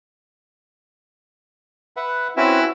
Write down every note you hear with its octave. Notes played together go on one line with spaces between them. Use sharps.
B4 E5 F#5
C4 C#4 E4 F#4 B4 E5